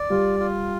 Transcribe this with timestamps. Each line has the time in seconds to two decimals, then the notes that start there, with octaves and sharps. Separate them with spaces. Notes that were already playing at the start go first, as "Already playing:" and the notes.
Already playing: D5
0.10 G3 F4 G4
0.40 F4